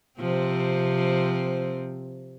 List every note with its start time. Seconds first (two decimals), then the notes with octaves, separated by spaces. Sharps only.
0.20 C3 F3 C4